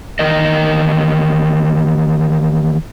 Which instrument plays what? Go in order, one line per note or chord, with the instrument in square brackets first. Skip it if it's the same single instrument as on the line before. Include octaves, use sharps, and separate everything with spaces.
[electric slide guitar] E2 D#3 A#4 D#5